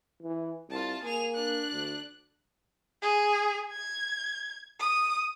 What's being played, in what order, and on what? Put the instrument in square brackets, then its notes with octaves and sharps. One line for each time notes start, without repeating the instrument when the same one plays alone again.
[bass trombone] E3
[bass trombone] C2 [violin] F4 A5
[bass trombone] A#3 [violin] G#4 F7
[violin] D4 F#6
[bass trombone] D2
[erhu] G#4
G#6
D#6